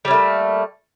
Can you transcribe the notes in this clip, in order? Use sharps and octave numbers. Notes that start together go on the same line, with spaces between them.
G3 A3 A#3 C#4